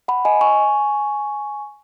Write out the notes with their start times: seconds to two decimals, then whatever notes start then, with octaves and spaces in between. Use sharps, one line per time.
0.08 F#5 B5
0.25 D#5 G#5
0.41 G#5 C#6